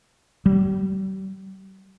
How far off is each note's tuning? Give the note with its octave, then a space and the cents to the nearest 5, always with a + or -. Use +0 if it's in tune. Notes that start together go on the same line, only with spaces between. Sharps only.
G3 -40